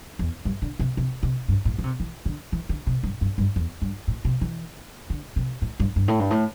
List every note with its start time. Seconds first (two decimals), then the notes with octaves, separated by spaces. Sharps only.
0.19 E2
0.45 G2
0.62 D3
0.79 C3
0.97 C3
1.23 C3
1.48 G2
1.65 A2
1.79 D3
1.84 C3
2.00 E3
2.26 D3
2.52 E3
2.69 D3
2.87 C3
3.03 G2
3.21 G2
3.38 G2
3.56 E2
3.82 G2
4.08 A2
4.25 C3
4.41 E3
5.10 D3
5.36 C3
5.62 A2
5.80 G2
5.96 G2
6.08 A2
6.19 G2
6.31 A2